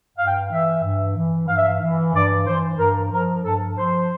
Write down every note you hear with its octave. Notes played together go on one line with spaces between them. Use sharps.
G2 F5
G5
F5
E3 E5
G2
E3
G2 F5
E5
F5
E3
G2 D5
E3 C5
G2 A#4
F3 A#4
G2 A4
F3 C5